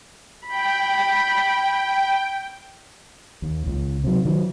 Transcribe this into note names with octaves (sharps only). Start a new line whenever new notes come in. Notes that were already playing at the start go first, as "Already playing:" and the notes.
G5 B5
D#2
C#2
C3 F#3
D#3 F#3